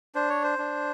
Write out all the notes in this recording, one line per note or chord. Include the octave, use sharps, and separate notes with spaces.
D4 C5
C#5
C5
D4